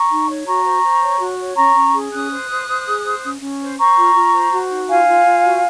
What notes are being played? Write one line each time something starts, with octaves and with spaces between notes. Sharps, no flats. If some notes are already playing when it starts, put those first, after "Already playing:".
Already playing: A#5 C#6
D#4
C#5
F#4 A#5 C#6
C5
C5
C#5
F#4
C#5
C#4 A#5 C#6
C#4
G#4
C#4 D#6 F#6
C5
C5
C5
G#4
C5
C#4
C#4
C5
C5 A#5 C#6
F4
F4
C5
F#4
D#4
F4 F5 G#5
F4
F4
F#4